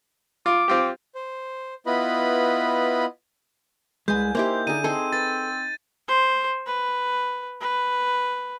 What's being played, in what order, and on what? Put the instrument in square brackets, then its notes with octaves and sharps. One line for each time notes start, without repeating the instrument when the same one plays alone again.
[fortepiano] F4 [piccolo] D6
[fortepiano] C4 F4 G4
[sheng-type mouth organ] C5
B3 E4 F4 B4 D#5 B5
[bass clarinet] C2 [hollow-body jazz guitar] G#3 [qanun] B4 G#5 [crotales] G6
[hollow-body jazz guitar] A#3 G4 [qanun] D#4 E4 A#5 [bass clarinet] C5
[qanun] D3 G#4 [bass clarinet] D#4 [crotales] D#7
[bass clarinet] C4 [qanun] D#4 G#4 C5 [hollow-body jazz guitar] A4
[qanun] B4 [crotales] A6
[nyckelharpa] C5
B4
B4